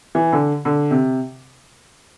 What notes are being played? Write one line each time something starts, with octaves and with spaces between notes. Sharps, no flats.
E3
D3
D3
C3